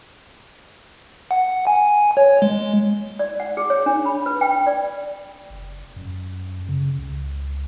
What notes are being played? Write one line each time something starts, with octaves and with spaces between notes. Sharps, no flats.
F#5
G#5
C#5
G#3
D5
F#5
G#4
C#5
D4
B5
B4
G5
D5
F#1
F#2
C#3
C#2